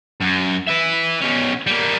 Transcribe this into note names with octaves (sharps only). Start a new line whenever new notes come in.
F#2
B4 E5
B2 C#4
G3 A#3